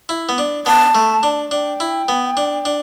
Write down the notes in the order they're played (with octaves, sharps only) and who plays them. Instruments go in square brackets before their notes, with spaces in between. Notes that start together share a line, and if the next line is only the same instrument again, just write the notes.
[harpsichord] E4
B3
D4
[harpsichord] B3 [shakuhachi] A5
[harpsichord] A3
D4
[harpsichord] D4 [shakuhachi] G5
[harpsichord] E4
B3
D4
D4